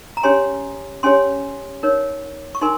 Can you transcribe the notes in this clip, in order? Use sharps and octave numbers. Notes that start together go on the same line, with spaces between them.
A#5
C#4 G4 C#5 G#5 C6
C#4 G4 C#5 G#5 C6
D#4 A#4 C#5
C#6
D#4 A#4 G#5 C6